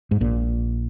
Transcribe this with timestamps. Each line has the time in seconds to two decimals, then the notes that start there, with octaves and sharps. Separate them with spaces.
0.11 G#2
0.21 A#1 A#2